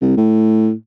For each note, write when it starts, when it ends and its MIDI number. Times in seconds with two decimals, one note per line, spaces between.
0.02 0.14 36
0.17 0.72 45